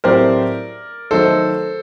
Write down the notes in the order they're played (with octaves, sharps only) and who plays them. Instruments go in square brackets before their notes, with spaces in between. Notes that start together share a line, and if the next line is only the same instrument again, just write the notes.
[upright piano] A2 F#3 C4 G4 C5 [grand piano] A#4 D5
[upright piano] D#3 F#3 A3 D#4 [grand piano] A4 C5